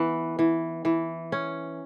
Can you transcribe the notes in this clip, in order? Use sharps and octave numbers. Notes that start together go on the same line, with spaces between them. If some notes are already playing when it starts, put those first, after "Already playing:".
Already playing: E3 B3
E3
E3
C#4